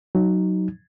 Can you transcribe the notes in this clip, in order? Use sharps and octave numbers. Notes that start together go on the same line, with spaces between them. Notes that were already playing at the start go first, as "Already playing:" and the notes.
F#3 D#4